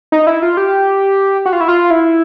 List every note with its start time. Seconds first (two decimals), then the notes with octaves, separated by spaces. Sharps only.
0.12 D#4
0.27 E4
0.42 F4
0.57 G4
1.46 F#4
1.53 F4
1.61 E4
1.68 F4
1.91 E4